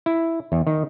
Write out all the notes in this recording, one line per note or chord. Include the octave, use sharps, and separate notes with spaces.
E4
E2
D#3